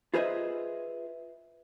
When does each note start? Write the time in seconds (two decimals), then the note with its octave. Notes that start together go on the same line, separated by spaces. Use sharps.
0.14 F4 G#4 B4 C5 D#5 E5